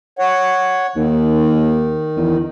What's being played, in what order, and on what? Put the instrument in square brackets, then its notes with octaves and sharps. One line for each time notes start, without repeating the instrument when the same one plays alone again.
[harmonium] C#5 F#5
[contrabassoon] D#2 [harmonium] D#3
[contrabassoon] E2